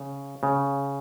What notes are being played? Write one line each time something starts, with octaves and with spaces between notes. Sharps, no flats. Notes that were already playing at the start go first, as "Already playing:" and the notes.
Already playing: C#3
C#3